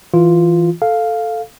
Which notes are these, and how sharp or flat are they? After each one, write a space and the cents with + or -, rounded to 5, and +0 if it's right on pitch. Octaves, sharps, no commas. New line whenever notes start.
E3 +0 F4 -5
A4 +0 F5 +0